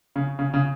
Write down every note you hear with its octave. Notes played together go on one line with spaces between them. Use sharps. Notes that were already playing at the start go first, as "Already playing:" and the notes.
C#3
C#3
C#3